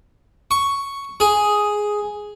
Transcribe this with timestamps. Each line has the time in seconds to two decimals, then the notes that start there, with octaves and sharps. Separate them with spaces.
0.51 C#6
1.20 G#4